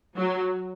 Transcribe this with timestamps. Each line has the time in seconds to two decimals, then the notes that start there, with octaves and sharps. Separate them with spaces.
0.17 F#3